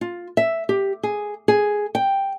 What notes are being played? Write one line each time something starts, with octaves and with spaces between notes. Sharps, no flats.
F4
E5
G4
G#4
G#4
G5